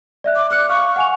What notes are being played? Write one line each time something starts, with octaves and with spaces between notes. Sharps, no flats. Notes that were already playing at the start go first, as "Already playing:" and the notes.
D5 E5 F#6
D6
D6 F6 F#6 C#7
F5 C#6 F6
F#5 G#5 F7